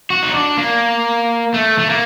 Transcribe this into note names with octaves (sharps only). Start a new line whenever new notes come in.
F#4
D#4
D4
A#3
A3
A3
A#3